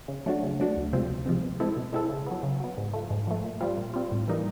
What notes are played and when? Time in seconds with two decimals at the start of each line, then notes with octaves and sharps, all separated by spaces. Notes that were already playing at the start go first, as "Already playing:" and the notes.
0.08 C#3
0.26 F#3 A3 D4 F#4
0.43 C#3
0.59 F#3 A3 D4 F#4
0.76 D2
0.93 C3 F3 G#3 C4
1.10 D2
1.26 C3 F3 G#3 C4
1.43 B2
1.60 G#3 C4 E4 A4
1.77 B2
1.93 G#3 C4 E4 A4
2.09 C#3
2.26 F#3 B3
2.43 C#3
2.60 F#3 B3
2.77 G#2
2.94 F3 A3
3.10 G#2
3.27 F3 A3
3.44 A#2
3.60 G3 C4 F4
3.77 A#2
3.94 G3 C4 F4
4.11 A2
4.28 E3 G3 A#3 D#4